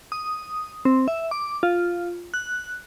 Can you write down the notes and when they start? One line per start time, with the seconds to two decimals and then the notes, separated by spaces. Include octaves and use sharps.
0.12 D#6
0.85 C4
1.08 E5
1.31 D6
1.63 F4
2.34 F#6